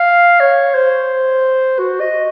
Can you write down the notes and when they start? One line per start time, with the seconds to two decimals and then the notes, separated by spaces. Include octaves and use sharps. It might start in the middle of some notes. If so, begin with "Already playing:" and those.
Already playing: F5
0.40 C#5
0.75 C5
1.79 F#4
2.00 D#5